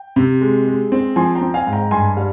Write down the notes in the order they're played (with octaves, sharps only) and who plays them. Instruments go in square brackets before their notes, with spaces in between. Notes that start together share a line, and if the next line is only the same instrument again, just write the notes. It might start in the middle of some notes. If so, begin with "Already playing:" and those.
Already playing: [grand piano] G5
C3
G#3
G#3
C4
F3 G#5 C6
G5 A#5
C4
F5 G#5
G#2
G5 A#5
G2 G#5 C6
G3 F5